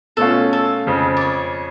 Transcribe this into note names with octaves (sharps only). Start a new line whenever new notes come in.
B2 A3 C#4 F4 A4
A4
F2 C#3 F3
D5
C#5